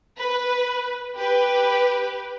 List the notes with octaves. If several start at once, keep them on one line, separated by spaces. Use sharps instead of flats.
B4
G4 B4